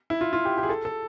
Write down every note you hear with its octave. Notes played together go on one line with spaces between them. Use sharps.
E4
F4
F4
G4
G4
G#4
A4
A4